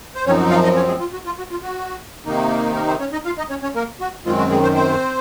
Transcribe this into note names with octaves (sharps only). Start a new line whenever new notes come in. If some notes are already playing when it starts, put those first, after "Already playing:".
C5
F#2 F3 C4 C#4 D#4 C#5
F#4
F4 F5
D#4 D#5
C#4 C#5
G#3 G#4
F4
F#4
F4
F#4
F4
F#4
C3 D#3 A#3 D#4
A#3 A#4
C4 C5
C#4 C#5
D#4 D#5
F4 F5
D#4 D#5
C#4 C#5
C#4 C#5
A#3 A#4
F#4
F#2 D#3 G#3 C4 F4
F#4
G#3 G#4
C4 C5
C4 C5